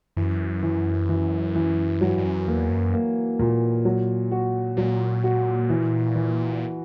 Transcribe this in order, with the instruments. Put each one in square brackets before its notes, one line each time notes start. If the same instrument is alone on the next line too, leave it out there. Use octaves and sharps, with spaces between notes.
[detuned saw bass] F#2 [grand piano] E3
[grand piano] E3
E3
E3
[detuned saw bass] G2 [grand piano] F#3
[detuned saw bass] G2
F#2
[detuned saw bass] E2 [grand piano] A#3
[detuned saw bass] F#2
[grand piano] A#3
A#2
F#3
F#4
[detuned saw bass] A#2 [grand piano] F#3
[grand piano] F#4
E3
E3